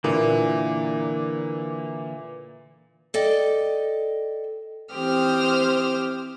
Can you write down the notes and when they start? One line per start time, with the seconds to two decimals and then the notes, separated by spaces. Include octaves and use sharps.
0.04 A#2 D3 E3 A#3
3.14 A4 D5 D#5 G5
4.94 E3 C4 G4 C5 D#6 F6